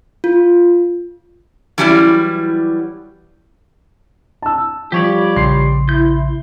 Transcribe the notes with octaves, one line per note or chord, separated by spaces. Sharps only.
F4
E3 F#3 G3 C#4 E4 D5
A5 E6
F3 G3 G4 C#5 D5
A#1 C#3 C6 C7
E4 G6